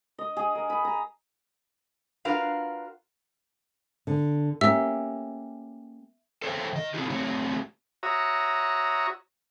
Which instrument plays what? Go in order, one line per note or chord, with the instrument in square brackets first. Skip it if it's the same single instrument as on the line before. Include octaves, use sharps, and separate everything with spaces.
[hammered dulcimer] D#5
G#4
A#4
B5
A#5
[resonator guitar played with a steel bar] D4 F4 F#4 A#4 B4 F5
[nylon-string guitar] D3
[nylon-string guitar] A#3 C#4 G4 [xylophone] E5 E6
[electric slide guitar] A4 C5 C#5 D#5 E5 G5
D#3 D#5
C3 C4 D#4 E4 F#4 G4
F#3 A3 C4 G4 C#5
[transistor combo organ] F#4 C#5 E5 A#5 D#6